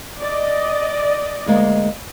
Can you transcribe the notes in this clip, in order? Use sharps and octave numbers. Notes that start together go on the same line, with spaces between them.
D5 D#5
D2 G#3 A#3